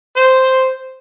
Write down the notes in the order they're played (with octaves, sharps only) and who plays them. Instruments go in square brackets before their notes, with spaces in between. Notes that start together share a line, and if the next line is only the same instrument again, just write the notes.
[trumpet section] C5